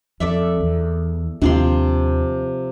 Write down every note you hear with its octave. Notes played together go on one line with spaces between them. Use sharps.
F2 A4 D5 E5
E2
D#2 C3 F3 D4 C6